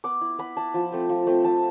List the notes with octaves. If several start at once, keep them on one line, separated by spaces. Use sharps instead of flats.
B3 D6
E4
B3 B5
E4 A5
F3
A3 C4
F3
A3 C4
F3 A5